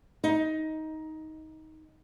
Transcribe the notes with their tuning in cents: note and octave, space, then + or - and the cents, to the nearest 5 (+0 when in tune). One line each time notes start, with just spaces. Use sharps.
D#4 +15